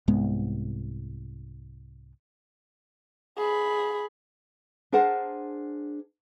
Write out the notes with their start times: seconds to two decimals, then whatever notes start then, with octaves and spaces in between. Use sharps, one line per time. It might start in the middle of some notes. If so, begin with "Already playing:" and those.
0.08 C2 G#2 G#3 B3
3.38 G#4 B5
4.92 D4 G#4 A#4 C5 F#5 A5